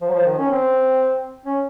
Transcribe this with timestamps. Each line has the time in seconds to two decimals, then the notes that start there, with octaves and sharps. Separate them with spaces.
0.02 F3
0.08 F#3
0.13 F3
0.26 D#3
0.38 C#4
0.50 C4
1.46 C#4